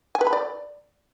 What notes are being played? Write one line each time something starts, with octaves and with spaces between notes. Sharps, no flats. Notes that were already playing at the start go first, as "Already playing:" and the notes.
G#5
B4
B5
D5